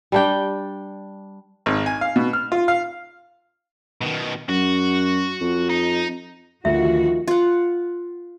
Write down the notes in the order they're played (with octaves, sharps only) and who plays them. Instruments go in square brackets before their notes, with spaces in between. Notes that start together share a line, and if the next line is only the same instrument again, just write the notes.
[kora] G3 D4 G5
[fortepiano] G#1
G#5
F5
B2
F6
F4
F5
[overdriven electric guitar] B2 D#3
[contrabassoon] F#2 [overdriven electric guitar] F#4
[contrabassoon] F2
[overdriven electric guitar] D#4
[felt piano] D2 [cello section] D#3 F3 F#4 [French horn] F4 [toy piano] E5
[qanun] F4 F#5